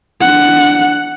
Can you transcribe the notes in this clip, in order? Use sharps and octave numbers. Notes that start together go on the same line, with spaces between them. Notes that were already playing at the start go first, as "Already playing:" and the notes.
D4 F#5